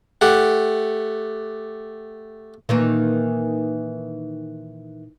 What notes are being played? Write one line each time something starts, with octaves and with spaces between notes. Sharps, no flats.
A3 G4 F#5
A#2 D#3 E3 A#3